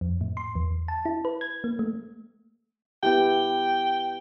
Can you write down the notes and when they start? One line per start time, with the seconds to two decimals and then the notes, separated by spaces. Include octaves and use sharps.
0.01 F2
0.21 A2
0.37 C6
0.55 E2
0.88 A5
1.05 E4
1.25 B4
1.41 G#6
1.64 A#3
1.79 A3
3.03 B3 E4 G4 G5